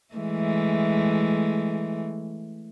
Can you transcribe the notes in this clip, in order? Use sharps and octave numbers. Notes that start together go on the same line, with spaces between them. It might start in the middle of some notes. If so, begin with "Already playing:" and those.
E3 G#3 A3